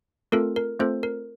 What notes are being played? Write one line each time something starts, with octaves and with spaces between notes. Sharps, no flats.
A3 C4 F4 A4 A#4
A#4
A3 C4 F4 A4 C5
A#4